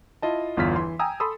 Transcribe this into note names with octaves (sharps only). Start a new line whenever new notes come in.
E4 F4 D#5 A5
G1 E2 F4 F6 B6
E3 C6
G5 G#5 A#5 D#6 E6
A4 B5 C6 D#6 E6